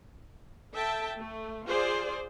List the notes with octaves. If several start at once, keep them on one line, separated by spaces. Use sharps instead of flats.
A4 E5 G5 A5
A3
F4 G#4 C5 D5